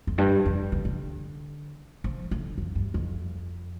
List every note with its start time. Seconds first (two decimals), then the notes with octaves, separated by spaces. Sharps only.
0.07 F2
0.18 G2
0.45 F2
0.72 D3
0.85 D3
2.04 F3
2.31 D3
2.58 F2
2.75 G2
2.94 F2